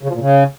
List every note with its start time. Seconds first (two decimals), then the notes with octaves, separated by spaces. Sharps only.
0.03 C#3
0.09 F3
0.15 A#2
0.21 C#3